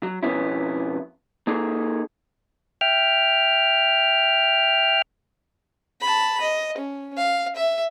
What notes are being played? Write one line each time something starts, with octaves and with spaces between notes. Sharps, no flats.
F#3
F2 B2 B3 C#4 E4
A#3 D#4 G#4 A4
E5 G5 F6
A5 B5
D#5
C#4
F5
E5